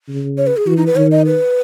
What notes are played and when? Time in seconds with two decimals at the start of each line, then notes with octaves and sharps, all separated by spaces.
0.08 C#3
0.37 C#5
0.47 B4
0.57 G#4
0.67 E3 F#4
0.76 D#4
0.86 B4
0.96 D#3 C#5
1.11 D#5
1.26 B4